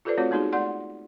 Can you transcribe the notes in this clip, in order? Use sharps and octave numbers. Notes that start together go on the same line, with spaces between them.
F4 G4 A4 B4 C5 D5
A3 C4 F4 F#4 C#5
G#3 B3 D#4 F#4 G#4
A3 D5 F#5 C6